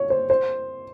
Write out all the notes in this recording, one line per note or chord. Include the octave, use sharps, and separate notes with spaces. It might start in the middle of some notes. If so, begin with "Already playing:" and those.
Already playing: C#5
C5
C5